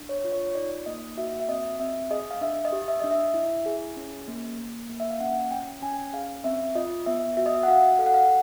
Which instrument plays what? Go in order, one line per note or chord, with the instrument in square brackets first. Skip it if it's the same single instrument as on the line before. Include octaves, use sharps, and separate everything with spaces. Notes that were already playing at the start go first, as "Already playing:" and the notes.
Already playing: [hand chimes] D4
C#5
F4
C#5
D#4 D5
A#3 D#5
F#4 E5
E5
C4 D#5
C4 E5
G#4 D#5
F5
D4 E5
D#5
G4
E5
D4 D#5
E5
E4
G#4
C#4
A#3
A#3
A#3
E5
F5
C#4 F#5
C#4 G5
C#4 G#5
G#4 F5
C4 E5
F4 D#5
B3 E5
F#4 E5
D#5
E5
F#5
F#4 F5
A4 F5
F#5
F5